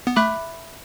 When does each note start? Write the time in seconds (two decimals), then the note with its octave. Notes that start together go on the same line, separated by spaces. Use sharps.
0.07 B3
0.16 A3 E5 B5 D6 F#6